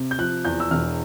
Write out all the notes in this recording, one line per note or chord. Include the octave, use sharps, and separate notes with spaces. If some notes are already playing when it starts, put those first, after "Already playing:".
Already playing: C3
G6
F3 F#6
E2 G6
E6
E1 F6